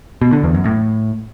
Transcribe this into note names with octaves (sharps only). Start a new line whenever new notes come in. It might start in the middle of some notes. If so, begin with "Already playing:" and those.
B2
D3
E2
F#2
A2